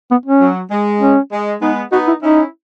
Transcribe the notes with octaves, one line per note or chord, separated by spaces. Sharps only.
B3
C#4
F#3
G#3
C#4
G#3
G#3 B3 D#4
B3 D#4 F#4
E4
C#4 D#4 E4